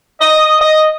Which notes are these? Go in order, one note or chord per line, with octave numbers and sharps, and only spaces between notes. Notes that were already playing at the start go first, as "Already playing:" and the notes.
D#5
D#5